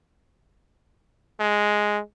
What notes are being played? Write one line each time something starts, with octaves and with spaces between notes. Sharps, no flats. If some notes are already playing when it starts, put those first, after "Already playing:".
G#3